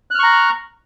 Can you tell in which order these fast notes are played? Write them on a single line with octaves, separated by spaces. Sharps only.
F#6 F6 C#6 A#5